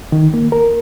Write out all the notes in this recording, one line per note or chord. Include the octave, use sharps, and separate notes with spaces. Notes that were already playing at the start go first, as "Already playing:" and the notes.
D#3
A#3
A#4